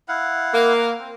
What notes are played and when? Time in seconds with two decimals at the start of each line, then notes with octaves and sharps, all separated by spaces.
0.08 E4 F5 F#5
0.54 A#3
0.99 C4